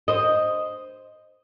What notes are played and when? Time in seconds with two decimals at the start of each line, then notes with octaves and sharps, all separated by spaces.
0.08 C5 D#5